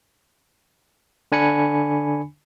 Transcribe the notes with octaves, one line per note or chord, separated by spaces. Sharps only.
D3 D4 G#5 B5 C#7